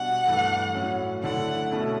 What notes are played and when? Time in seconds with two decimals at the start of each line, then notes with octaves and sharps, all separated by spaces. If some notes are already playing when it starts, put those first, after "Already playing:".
Already playing: B2 G3 D4 F#5
0.27 G2 E3 A3
0.75 A2 F#3 C#4
1.23 D3 A3 E4 F#5
1.71 B2 A3 C#4 E4